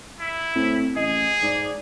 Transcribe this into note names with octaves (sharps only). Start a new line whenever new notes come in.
E4
A2 C4
A1 G#4 D#5
G#2 D5